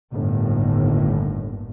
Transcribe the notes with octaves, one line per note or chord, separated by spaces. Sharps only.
G1 D#2 A2